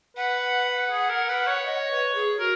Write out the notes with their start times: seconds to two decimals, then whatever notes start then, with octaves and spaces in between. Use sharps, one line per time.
0.16 B4 F#5
0.91 G#4
1.10 A#4
1.29 B4
1.47 C#5
1.65 D#5
1.91 B4
2.15 G#4
2.39 F#4 A#4